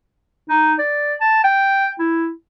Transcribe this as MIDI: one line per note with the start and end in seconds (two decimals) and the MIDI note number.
0.50 0.74 63
0.79 1.14 74
1.21 1.40 81
1.44 1.90 79
1.99 2.29 64